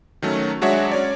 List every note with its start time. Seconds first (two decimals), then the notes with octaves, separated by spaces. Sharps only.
0.22 D#3 F#3 A3 C#4
0.61 F#3 G#3 D4 F#4 C#5 E5
0.92 C#4 C#5 D5